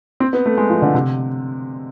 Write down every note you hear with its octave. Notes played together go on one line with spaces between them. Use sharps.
C4
B3
A3
G#3
F3
D3
C3